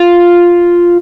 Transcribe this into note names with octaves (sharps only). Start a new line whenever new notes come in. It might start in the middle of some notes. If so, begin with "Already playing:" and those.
Already playing: F4